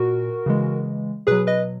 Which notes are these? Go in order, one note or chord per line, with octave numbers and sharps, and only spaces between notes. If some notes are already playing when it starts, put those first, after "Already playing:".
Already playing: A#2 F#4 A#4
C#3 E3 G#3
B2 F#3 G#4 B4
B4 D#5